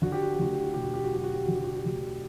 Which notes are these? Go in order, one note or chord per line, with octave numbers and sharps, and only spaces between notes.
D3 F#4
G4
F#4
G4
D2 F#4
G4
F#4
E1 G4
F#4
G4
F#4
F#3 G4
F#4
G4
D3 F#4
G4
F#4
G4
D2 F#4